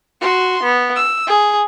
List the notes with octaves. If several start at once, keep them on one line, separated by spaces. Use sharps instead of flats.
F#4 C6
B3
E6
G#4